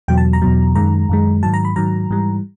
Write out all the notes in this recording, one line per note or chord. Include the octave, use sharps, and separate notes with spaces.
E2 B2 F#3 G5
A5
A#5
E2 B2 F#3
F#2 D#3 G#3 A#5
F#2 D#3 G#3
G#2 D#3 F#3 A5
A#5
B5
G#2 D#3 F#3 A#5
G#2 E3 G3